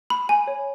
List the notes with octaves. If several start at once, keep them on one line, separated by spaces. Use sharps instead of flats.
B5
G#5
C#5